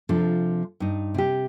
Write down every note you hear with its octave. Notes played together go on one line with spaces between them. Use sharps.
C3 F3 D4 F4 A4
G2 D#4
C3 G4